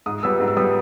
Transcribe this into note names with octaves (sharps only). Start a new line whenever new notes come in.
G#2 D#6
G3 B3 E6
G#2
E6
G3 B3 D#6